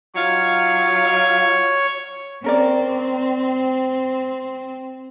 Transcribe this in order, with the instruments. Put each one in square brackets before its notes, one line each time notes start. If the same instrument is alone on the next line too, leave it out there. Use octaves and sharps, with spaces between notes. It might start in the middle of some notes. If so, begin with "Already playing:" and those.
[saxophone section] F#3 D#4 F4 [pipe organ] C#5
[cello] C4 [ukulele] C#4 A#4 D5